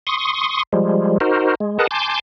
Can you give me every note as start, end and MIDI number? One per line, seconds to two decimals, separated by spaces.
0.07 0.63 84
0.07 0.63 85
0.07 0.63 87
0.73 1.18 53
0.73 1.18 55
0.73 1.18 56
1.21 1.55 63
1.21 1.55 66
1.21 1.55 70
1.21 1.55 72
1.60 1.78 56
1.79 1.87 68
1.79 1.87 70
1.79 1.87 71
1.79 1.87 75
1.79 1.87 78
1.79 1.87 81
1.91 2.20 80
1.91 2.20 81
1.91 2.20 84
1.91 2.20 86
1.91 2.20 91